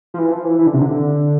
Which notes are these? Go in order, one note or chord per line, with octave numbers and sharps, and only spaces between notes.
F3
E3
F3
E3
E3
D3
C3
D3